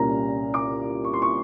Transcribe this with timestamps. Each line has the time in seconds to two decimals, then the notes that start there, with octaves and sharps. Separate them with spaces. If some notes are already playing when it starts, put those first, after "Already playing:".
Already playing: C2 A#2 G3 A#3 C#4 A#5
0.54 D6
1.04 C#6
1.14 C6
1.22 C#6